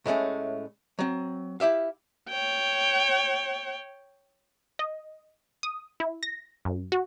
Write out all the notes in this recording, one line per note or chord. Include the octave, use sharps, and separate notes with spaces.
A2 G#3 A3 C#4
F#3 C4
E4 G4 E5 F5
C#5 G5
D#5
D#6
E4
A#6
F#2
F#4